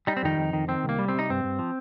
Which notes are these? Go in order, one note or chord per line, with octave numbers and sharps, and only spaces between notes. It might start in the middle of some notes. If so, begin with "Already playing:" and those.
G3 D#4
C4
F2 D#3 D#4
F2
D#3
D#3 C4
C2
A#3
G3
C4
C3 D#4
G2 C4
G2
F3